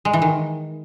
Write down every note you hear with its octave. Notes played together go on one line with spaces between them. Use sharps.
G#3
E3
D#3